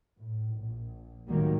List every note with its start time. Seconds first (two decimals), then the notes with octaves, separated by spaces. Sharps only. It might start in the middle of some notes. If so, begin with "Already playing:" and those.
0.18 A2
0.55 A#1
1.27 C#2 A2 D#3 F#3 G3 A#3